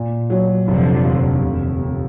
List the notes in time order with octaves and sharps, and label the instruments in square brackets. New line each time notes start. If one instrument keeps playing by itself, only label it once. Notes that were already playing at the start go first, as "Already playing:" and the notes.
Already playing: [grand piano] A#2
F#3
[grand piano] F1 [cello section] D3 F3
[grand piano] D#2
F1
F2